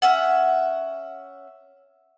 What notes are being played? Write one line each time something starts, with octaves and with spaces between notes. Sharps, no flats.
C#4 E5 F#5